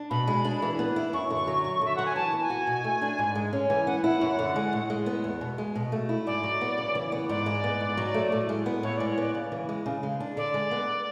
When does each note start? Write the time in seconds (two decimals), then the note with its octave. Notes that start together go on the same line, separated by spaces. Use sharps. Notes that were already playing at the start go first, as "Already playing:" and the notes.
Already playing: D4
0.10 B2 B5
0.27 G#3
0.45 D4
0.62 E3
0.79 B3
0.96 E4
1.13 F#2 C#6
1.30 D3
1.47 F#3
1.64 F#2
1.81 D3 E5
1.96 F#3 F#5
2.06 G#5
2.16 E3 A5
2.33 B3
2.41 G#5
2.50 F#4
2.67 B2
2.84 A3
3.02 D4
3.19 G#2
3.35 G#3
3.53 C#4
3.69 E3 G#5
3.86 B3 F#5
3.99 G#5
4.04 E4 F#5
4.21 F#2
4.39 D3
4.56 G#3
4.73 A2
4.90 G#3
5.06 B3
5.24 E2
5.41 B2
5.58 G#3
5.76 B2
5.92 A3
6.09 E4
6.26 G#2 D5
6.44 F#3
6.61 B3
6.78 C#3
6.95 E3
7.12 B3
7.29 G#2 D5
7.46 G#3
7.64 B3
7.81 G#2
7.97 F#3
8.14 A3
8.32 A2
8.49 G#3
8.66 B3
8.83 A2 C#5
8.96 G#3 D5
9.08 C#5
9.18 B3 D5
9.35 C#3
9.52 E3
9.69 G#3
9.86 C#3
10.03 G#3
10.20 D4
10.37 D3 D5
10.54 G#3
10.71 B3